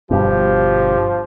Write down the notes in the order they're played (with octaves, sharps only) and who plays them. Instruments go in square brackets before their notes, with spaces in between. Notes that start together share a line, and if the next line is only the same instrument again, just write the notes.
[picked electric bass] G1 G2 B2 [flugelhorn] F3 [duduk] G4